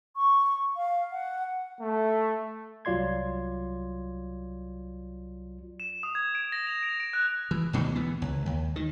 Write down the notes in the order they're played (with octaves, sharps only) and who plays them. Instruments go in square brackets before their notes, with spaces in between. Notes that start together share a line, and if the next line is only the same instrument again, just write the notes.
[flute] C#6
F5
F#5
[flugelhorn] A3
[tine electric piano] C2 F#3 F4 D5 C6 G#6
[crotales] E7
D#6
G#6
D7
A#6
F7
D7
D7
F#6
[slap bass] E3
D2 B2 D3 D#3
E3 B3
C#2
D#2
D#3